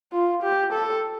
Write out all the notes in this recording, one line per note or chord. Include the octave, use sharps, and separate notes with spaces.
F4
G4
A4